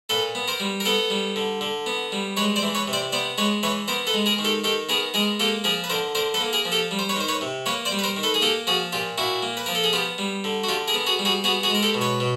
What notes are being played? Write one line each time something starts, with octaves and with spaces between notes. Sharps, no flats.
A#2 A4 B4
B3
A#4 C5
G3
A#4
B3 A4 B4
G3
D3
D3
B3
G3
G#3 B4 C#5
C5 D5
E3
B4 C#5
C3
C5 D5
B3 C5 D5
G#3 B4 C#5
E3 B4 C#5
B3 A#4 C5
A4 B4
G#3
G#4 A#4
D#3
G4 A4
D#3 G4 A4
B3 G#4 A#4
G#3 G#4 A#4
A#3 G4 A4
F3 G#4 A#4
B4
D3 A#4 C5
D3 A#4 C5
A4 B4
A#3
G#4 A#4
F3
G4 A4
G3
C5
B4 C#5
D#3 C5
B4 C#5
C3
A#3 B4 C#5
C5 D5
G3
B4
A#4 C5
D#3
A4 B4
G#4
A#3 G4 A4
F3 F#4 G#4
A#2 F4 G4
A#2 E4 F#4
A#3
B4
F3 A#4
A4
G#4
B3 F4 G4
G3
D3
F#4
D3 F4 G4
G#4 A#4
B3
F#4 G#4
G3
F#4 G#4
B3 F#4 G#4
F#4 G#4
G#3 A#4
G4 A4
B2
B4 C#5
B2